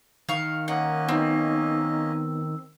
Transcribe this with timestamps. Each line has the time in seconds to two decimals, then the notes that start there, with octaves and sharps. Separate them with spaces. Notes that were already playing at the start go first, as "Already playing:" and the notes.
0.29 D#3 F5 C#6
0.68 A#3 C#4 D#5 F#5
1.09 B3 C4 D#4